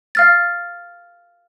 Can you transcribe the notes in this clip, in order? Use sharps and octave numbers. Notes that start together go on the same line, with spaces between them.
F5 F6 A6